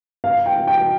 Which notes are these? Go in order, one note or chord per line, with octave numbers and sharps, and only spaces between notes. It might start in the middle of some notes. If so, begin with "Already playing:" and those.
F5
G5
G5